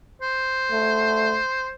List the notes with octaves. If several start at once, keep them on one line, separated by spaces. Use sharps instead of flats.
C5
A3